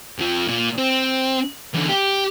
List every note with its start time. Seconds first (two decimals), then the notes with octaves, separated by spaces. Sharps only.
0.19 F2 F3
0.48 A#2
0.78 C4
1.74 E2 D3
1.88 G4